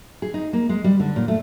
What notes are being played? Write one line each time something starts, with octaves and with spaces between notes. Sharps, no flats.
G#4
D#4
A#3
G#3
G3
D3
A#2
A3